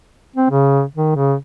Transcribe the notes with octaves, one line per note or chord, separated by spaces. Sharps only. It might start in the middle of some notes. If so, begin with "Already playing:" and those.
C4
C#3
D#3
C#3